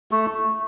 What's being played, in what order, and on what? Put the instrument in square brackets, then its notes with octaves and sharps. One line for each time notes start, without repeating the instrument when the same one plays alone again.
[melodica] A3